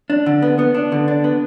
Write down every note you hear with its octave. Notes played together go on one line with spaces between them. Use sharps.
D4
D3
B3
B3
D4
D3
D4
B3